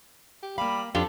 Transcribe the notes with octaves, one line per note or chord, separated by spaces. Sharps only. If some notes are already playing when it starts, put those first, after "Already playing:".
G4
G3 A#3 F5 B5
F2 D4 F4 G4 A4